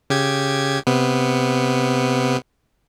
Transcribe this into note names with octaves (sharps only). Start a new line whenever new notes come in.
C#3 G4 G#6
C3 B3